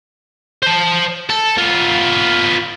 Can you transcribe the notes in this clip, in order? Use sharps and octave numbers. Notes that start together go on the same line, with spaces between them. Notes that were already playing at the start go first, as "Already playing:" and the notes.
C5 A5
A4
B3 F4